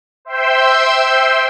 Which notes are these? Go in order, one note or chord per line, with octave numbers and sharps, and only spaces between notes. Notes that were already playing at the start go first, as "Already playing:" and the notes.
C5 E5 G5 C6 E6 G6